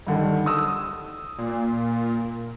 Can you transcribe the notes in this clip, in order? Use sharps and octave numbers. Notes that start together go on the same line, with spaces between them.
G2 D3 D#3
D#6 E6
A#2